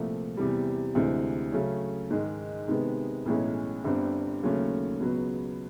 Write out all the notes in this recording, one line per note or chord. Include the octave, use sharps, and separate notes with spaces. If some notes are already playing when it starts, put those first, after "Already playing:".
Already playing: C2 A#2 F3 A3
E2 C3 E3 G3
D2 C3 E3 G#3 C4
C#3 F#3 A3 C#4
G#2 D#3 G#3
C3 D#3 G#3 B3
B1 A2 E3 G#3 C#4
G1 G2 D3 G3 C4
D#2 C#3 F#3 A3 C#4
C#2 B2 F#3 B3